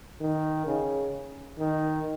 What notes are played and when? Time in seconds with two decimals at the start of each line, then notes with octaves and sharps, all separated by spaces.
0.21 D#3
0.67 C#3
1.59 D#3